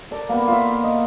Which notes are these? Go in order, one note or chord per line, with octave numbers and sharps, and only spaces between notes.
A4 A#4 D5
A#3 B3 F#5
F4 E5
D#5